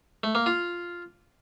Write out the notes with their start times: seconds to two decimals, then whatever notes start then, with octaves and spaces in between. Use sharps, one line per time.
0.23 A3
0.35 A#3
0.46 F4